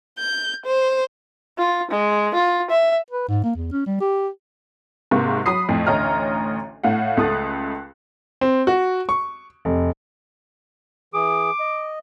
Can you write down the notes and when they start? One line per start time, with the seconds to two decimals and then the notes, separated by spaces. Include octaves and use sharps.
0.19 G6
0.66 C5
1.58 F4
1.91 G#3
2.34 F4
2.70 E5
3.11 B4
3.29 G#2
3.44 A#3
3.56 E2
3.72 C#4
3.86 G3
4.00 G4
5.11 G#2 C3 A#3 C#6
5.46 F#3 B5 D#6 C7
5.69 F2 A2
5.87 A1 D2 C#5 D#5 A#5 F6
6.84 A2 F5 F#5
7.17 C#2 A3 D#6 F#6 A6
8.41 C4
8.67 F#4
9.09 C#6
9.65 F1
11.14 E3 G#4 D6 D#6
11.60 D#5